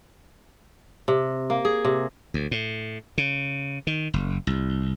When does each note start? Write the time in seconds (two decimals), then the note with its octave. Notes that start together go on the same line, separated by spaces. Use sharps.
1.08 C3
1.50 A#3
1.65 G#4
1.84 C3
2.34 D2
2.51 A2
3.18 C#3
3.87 D#3
4.14 F#1
4.47 C2